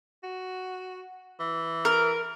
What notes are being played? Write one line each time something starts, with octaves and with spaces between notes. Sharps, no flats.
F#4
E3
A#4